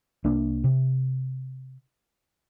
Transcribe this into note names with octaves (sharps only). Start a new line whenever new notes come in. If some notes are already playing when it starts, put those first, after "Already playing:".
C2 A#3 D4
C3